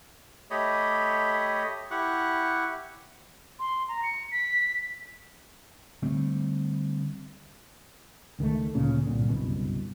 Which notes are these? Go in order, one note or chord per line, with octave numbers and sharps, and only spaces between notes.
A3 G4 C#5 D#5 B5
E4 G4 F#5 C#6 F#6
C6
A#5
C#7
B6
D3 G3 A3 C4
C#2 D#3 G#3 A3
D2 A#2 C#3
C2 G2 A#2 D3
F#1 C2 G2 B2